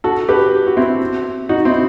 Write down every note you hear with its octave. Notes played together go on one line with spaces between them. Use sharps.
F#4 A4
G4 B4
F#4
C4 E4
D#4 F#4
C4 E4